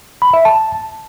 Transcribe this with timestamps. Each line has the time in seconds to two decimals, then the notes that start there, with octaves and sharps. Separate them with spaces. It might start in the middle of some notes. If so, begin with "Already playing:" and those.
0.22 B5
0.33 E5
0.45 A5